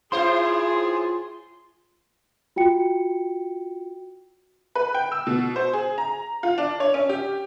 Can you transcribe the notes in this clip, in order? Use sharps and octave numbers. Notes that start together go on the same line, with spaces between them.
A2 E4 F4 G#4 C5 C6
F4 F#4 G5 C#7
B4
G5
E6
B2
C5
G#4
A#5
F4
D4
C#5
C#4
G4